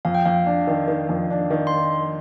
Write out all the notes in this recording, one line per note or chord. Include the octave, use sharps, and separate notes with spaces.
F2 F5
G5
F2 F5
D4
D#3
D#3
F2
D4
D#3
C6